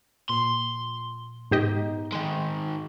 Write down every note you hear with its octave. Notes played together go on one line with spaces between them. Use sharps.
A#2 C6
G#2 B3 D#4 G4 D#5
D#3 G#3